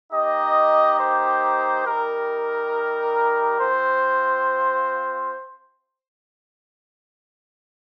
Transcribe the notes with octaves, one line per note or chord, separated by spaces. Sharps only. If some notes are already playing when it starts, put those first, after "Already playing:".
A#3 D#4 G4 D#5
C5
G3 D#4 G4 A#4
C4 F4 C5